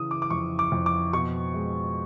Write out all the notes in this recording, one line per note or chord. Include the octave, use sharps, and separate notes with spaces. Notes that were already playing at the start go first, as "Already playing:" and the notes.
Already playing: C#3 E3 D#6
D6
D6
F2 C#6
D6
F2
D6
B2 C#6
G#3